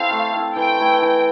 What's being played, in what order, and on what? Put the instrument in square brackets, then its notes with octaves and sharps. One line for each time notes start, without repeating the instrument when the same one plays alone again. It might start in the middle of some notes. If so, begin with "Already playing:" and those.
Already playing: [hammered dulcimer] C4 E4 A4 [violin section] F5
[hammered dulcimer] A3
C4 E4 A4
[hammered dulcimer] E3 [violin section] G5
[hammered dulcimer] A3 E4
E3